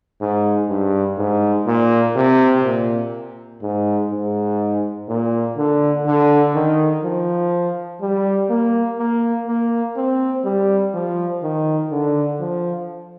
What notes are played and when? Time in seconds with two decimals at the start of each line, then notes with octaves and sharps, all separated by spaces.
0.21 G#2
0.69 G2
1.18 G#2
1.67 A#2
2.16 C3
2.64 A#2
3.62 G#2
4.11 G#2
5.09 A#2
5.57 D3
6.06 D3
6.55 D#3
7.04 F3
8.01 G3
8.50 A#3
8.99 A#3
9.47 A#3
9.96 C4
10.45 G3
10.94 F3
11.43 D#3
11.91 D3
12.40 F3